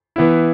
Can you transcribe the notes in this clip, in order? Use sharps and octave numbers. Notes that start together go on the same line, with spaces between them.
E3 B3 E4